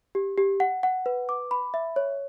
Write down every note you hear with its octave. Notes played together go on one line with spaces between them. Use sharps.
G4
G4
F#5
F#5
B4
D6
B5
E5
C#5